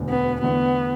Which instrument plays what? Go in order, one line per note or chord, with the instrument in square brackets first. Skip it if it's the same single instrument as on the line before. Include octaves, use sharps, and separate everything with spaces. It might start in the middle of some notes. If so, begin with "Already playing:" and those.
Already playing: [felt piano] E1 D2 D3
[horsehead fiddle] B3
[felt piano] E2 D3 A3 [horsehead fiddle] B3